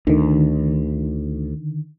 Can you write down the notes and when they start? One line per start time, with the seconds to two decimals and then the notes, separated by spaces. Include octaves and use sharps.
0.07 D2 D3 D#3